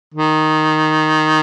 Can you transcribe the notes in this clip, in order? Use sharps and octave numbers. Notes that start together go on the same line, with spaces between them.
D#3